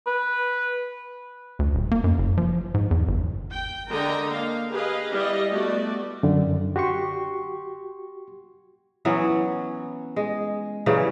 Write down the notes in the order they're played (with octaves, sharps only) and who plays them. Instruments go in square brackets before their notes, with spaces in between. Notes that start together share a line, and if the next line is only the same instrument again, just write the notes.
[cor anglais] B4
[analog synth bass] D2
D#1
A#3
F#2
F#1
F3
G#2
E2
G1
[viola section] G5
D3 G#3 A#4 D#5 G5 A#5
A#3 F5
G4 G#4 B4 D#5 F5
G3 E4 D#5
A3 B3 F#4 D5
[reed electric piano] F#2 D3
F#4 G4 C6 C#6
[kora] E3 F#3 B3 C#4
G#3
C#3 E3 F#3 G3